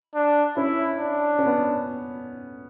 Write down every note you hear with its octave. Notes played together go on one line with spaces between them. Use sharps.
D4
C#4 E4
D4
C#4
B3